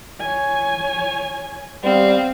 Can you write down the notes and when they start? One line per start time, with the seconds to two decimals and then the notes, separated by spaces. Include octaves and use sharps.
0.20 C#5 G#5
1.84 G3 B3 C4 F5